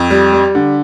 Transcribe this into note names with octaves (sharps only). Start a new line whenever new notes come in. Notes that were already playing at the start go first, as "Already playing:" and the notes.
Already playing: F2
G3
G3
D3